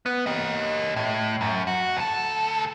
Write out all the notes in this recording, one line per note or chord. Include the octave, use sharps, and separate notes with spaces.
B3
G4 D#5
A2
F#2
F#4
D2 A4